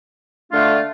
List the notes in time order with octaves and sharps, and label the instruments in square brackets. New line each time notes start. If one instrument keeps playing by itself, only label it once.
[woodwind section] D3 A3 D4 F4